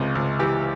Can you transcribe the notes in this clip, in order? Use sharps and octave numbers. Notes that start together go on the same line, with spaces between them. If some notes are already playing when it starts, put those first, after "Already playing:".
Already playing: C#2 C3 F4
C#2
E3 G4